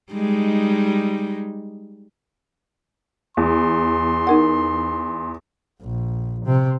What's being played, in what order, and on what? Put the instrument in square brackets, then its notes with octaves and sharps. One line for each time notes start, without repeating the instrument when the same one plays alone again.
[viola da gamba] G3 G#3 D#4
[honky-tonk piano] E2 [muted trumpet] C6
[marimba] D#4 A#4 F#5
[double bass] A#1
C3